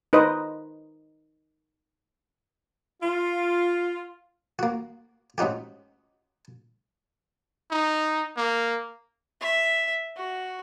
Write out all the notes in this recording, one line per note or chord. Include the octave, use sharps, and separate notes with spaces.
D#4 B4 C5 D#5
F4
A#3 F#4
G#2 C#4 D#4 F#4 G4
D#4
A#3
E5
F#4